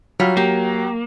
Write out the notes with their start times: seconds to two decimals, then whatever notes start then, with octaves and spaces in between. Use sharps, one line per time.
0.20 F#3 G3 F4
0.37 A#3 G4